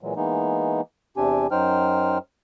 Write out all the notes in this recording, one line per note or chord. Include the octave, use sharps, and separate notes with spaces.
A#2 E3 F#3 G#3
E3 G#3 A#3 B3 D#4
E2 C3 C4 D4 G4 G#5
F#2 F#3 D#4 C5 G5 F6